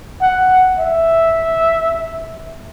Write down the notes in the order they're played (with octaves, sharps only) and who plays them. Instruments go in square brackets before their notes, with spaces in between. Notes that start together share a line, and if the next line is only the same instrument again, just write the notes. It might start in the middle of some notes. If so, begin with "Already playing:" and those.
[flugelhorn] F#5
E5